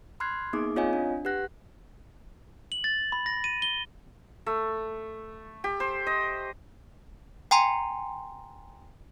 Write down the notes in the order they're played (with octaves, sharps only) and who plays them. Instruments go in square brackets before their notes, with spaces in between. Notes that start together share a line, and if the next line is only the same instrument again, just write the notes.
[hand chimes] B5 C6 F6 F#6 G#6 C7
A#3 B3 D#4 G#4 D6
C4 F4 C#5 D#5 F5 G#5
D4
G4 B4 F#5 F#6 A#6
[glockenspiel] F#7
A6
B5
A#6
D#7
G7
[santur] A3
G4
C5
D#5
[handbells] G5 G#5 A#5 C6